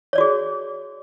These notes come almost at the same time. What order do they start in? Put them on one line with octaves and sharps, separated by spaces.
C#5 D5 F#4 G#4